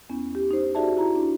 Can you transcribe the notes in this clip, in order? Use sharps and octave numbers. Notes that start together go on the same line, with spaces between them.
E2 B3 C#4
G4
D#4 C5
D#4 F#4 G#4 D5 E5 A5
E4 F#4 A#5
D4